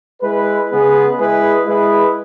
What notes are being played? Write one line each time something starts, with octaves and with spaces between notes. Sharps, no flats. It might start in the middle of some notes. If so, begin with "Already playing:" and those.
G#3 E4 B4
C#3 G#3 B3 G#4 B4
G#3 E4 G#4 B4
G#3 E4 G#4 B4